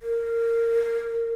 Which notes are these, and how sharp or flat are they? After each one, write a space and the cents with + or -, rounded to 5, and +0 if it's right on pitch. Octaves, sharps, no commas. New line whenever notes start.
A#4 -15